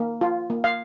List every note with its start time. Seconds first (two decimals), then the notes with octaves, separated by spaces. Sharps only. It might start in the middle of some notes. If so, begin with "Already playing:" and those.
Already playing: A#3
0.21 F4
0.50 A#3
0.64 F5